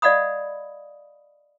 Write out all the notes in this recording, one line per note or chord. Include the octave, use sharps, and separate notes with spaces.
D5 D#5 F5 F#5 B5 D#6